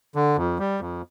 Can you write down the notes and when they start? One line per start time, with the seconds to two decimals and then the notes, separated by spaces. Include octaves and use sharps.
0.15 D3
0.37 F2
0.59 G3
0.80 F2